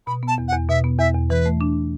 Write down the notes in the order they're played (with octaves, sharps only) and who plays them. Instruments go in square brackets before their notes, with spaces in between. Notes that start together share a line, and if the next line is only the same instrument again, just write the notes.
[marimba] B2 [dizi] B5
[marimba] B3 [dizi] A5
[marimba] E2
[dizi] F#5
[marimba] E2
[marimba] B2 [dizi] E5
[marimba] B3
[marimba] E2 [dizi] E5
[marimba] E2
[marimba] E3 [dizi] B4
[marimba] A3
D4